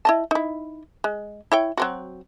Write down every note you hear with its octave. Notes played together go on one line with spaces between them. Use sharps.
E4 D#5 A5
D#4 E4
G#3
E4 C#5 G5
F#3 C4 F#4